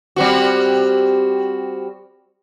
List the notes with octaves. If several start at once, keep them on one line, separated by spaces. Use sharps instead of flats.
G3 C4 F#4